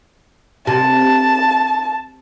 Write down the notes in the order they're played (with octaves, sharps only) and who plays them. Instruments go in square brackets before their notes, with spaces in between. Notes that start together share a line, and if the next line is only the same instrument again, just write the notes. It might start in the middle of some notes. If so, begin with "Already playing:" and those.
[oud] C3 [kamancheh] A5